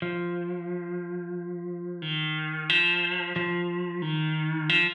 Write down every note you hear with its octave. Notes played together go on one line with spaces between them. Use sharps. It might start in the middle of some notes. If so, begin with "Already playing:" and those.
F3
D#3
F3
F3
D#3
F3